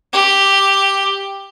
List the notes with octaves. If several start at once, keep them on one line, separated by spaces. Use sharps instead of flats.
G4